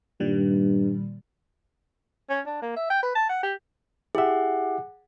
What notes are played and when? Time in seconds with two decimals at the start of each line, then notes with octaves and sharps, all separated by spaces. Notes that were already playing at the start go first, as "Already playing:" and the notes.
0.20 G2 A#2 D#3 G3
2.30 C#4
2.46 D4
2.62 A#3
2.76 E5
2.90 G5
3.02 B4
3.15 A5
3.29 F#5
3.43 G4
4.15 E4 G4 G#4 E5 F#5